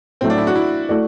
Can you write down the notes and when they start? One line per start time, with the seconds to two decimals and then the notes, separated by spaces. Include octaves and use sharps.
0.21 A2 F#3 A3 C4
0.30 D4
0.38 E4
0.47 F#4
0.56 E4
0.89 A3 E4 F#4 A4 D5